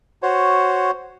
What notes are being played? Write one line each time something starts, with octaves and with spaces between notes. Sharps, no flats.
F#4 C5 C#5